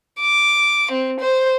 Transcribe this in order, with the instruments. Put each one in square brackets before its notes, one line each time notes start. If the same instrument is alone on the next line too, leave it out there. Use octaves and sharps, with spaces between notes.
[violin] D6
C4
C5